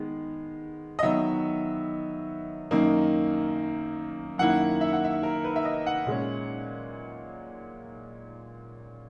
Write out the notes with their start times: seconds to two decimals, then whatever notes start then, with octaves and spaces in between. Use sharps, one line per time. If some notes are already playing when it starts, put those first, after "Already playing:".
Already playing: D#3 G#3 B3
0.99 D#5
1.03 D#3 F#3 B3 E5
2.71 F#2 D#3 A#3 D#4
4.38 F#2 D#3 A#3 E4 F#5
4.81 E5
4.93 F#5
5.04 E5
5.23 A#4
5.44 B4
5.56 E5
5.65 D#5
5.86 F#5
6.06 A#2 G#3 C#4